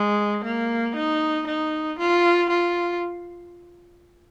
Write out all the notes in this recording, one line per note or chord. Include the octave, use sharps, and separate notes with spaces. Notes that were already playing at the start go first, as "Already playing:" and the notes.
Already playing: G#3
A#3
D#4
D#4
F4
F4